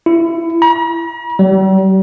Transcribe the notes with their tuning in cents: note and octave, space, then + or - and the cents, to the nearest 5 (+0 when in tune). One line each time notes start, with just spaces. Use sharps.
E4 +20
A#5 +45
G3 -45